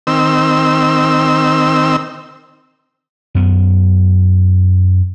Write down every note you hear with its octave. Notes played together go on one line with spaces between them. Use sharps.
D#3 C4 E6
F#2 B3